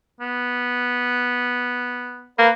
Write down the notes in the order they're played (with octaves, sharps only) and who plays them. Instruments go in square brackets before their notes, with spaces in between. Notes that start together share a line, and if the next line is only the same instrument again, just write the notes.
[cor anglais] B3
[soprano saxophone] A#3 [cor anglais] B4